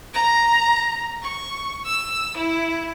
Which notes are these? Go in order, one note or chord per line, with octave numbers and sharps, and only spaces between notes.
A#5
C#6
E6
E4